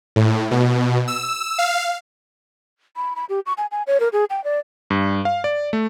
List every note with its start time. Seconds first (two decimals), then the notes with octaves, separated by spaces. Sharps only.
0.16 A2
0.51 B2
1.08 E6
1.58 F5
2.96 B5
3.16 B5
3.29 G4
3.46 C#6
3.58 G#5
3.71 G#5
3.87 C#5
4.00 A#4
4.13 G#4
4.30 G5
4.44 D5
4.90 G2
5.25 F5
5.44 D5
5.73 A3